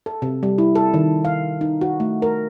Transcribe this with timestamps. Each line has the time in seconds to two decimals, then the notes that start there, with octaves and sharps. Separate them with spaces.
0.06 A4
0.22 C3
0.43 G3
0.58 E4
0.75 A4
0.94 D#3
1.25 F5
1.61 D#4
1.81 F#4
2.00 A3
2.22 A#4